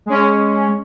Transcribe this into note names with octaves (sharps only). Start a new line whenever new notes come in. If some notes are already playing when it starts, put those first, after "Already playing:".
G#3 C#4